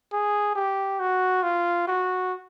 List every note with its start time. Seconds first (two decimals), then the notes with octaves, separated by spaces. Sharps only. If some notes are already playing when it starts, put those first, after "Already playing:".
0.13 G#4
0.55 G4
1.00 F#4
1.43 F4
1.88 F#4